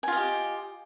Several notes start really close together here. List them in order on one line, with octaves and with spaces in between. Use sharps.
G#5 F4 D#5 G4